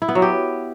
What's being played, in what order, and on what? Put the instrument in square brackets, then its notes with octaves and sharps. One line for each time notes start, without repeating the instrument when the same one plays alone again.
[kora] E4
B3
F#3
G4